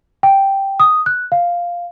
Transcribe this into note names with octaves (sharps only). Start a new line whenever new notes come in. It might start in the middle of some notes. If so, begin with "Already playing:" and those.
G5
D#6
F#6
F5